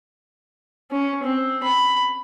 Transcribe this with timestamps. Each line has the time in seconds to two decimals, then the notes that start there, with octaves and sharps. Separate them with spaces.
0.91 C#4
1.23 C4
1.64 B5